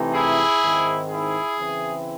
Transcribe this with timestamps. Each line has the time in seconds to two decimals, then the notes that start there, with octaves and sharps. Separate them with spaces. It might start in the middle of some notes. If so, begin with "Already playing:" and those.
Already playing: C3 E3 A3 C4 D#4
0.13 E4 G#4
0.61 G#2 D#3 G#3 C4
1.10 E4 G#4
1.57 C#3 E3 C4 E4